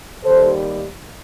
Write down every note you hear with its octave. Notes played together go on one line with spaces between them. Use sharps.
D#2 D#3 G3 A4 C5